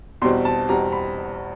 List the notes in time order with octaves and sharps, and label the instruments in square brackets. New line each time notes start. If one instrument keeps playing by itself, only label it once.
[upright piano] E2 B2 G3 C4 C6
A5
E2 B2 G3 C4 A#5
B5